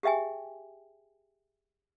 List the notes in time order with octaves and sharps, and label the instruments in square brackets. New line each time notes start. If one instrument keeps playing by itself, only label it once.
[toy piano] G4 G#4 E5 G5 G#5